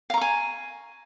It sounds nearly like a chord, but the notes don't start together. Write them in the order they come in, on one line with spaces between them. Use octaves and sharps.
F5 A#5 C#6 G#5